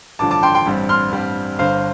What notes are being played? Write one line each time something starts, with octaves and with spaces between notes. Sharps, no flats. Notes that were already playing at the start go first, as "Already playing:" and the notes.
A1 G2 D3 F3 A5 D6
A5 D6
G5 C6
G5 C6
A1 G2 G3 C4
C6 F6
A1 G2 G3 C4
G1 G2 D3 C5 F5